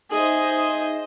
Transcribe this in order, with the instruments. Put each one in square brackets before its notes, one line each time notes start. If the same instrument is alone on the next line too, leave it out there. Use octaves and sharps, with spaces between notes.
[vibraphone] D#4 E5 [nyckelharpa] G#4 [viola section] C5 D#5